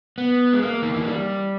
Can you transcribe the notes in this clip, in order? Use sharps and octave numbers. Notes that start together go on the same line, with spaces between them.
B3
G#3
A#3
D#3
E3
G3